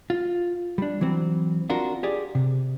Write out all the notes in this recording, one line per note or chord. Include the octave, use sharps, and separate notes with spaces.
F4
G3 D4
E3 F#3 C4
C4 D4 F4 F#4 A#4
G4 G#4 D5
C3